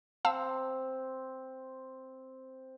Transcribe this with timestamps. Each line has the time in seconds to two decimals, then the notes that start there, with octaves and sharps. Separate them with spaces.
0.25 C4 F5 A5 E6